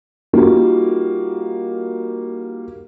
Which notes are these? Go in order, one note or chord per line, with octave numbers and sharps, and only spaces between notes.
G3 A#3 D#4 F4 F#4